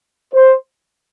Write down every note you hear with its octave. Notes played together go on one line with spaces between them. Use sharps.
C5